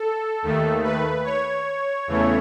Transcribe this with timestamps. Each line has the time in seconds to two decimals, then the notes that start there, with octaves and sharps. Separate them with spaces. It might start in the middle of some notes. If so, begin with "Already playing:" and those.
Already playing: A4
0.43 D#2 D#3 A3
0.83 B4
1.24 C#5
2.07 E2 C#3 E3 A3